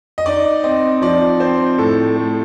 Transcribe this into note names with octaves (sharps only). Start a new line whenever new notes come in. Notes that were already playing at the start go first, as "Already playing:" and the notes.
D#5
D#4 D5
C4 D#5
F3 D5
C4 C5
A2 A4
A3